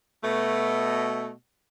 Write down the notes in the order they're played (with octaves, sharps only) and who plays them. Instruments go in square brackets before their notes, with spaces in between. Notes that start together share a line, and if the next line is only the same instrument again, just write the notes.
[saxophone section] B2 A3